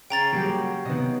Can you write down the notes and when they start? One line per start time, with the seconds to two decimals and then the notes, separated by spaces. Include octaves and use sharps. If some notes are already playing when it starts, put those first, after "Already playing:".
0.10 C#3 G5 A#5 A6
0.32 F#3 G3 A#3 F#4 G4
0.85 C3 D#3 B3 D#5